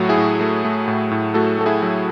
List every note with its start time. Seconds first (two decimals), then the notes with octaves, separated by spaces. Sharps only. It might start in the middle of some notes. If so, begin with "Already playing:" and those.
Already playing: A2 F#3 A3 F#4
0.09 E4 G#4
0.17 A2
0.41 A3
0.65 A3
0.88 A2
1.11 A2
1.34 A3 F#4 A4
1.59 A3 A4
1.66 E4 G#4
1.82 F#3